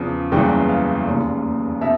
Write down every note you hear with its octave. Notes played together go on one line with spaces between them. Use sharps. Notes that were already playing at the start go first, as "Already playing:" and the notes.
Already playing: E2 C#3 F3
F#1 E2 C#3 E3 G3 G5
F5
F1 D#2 C#3
B2 E5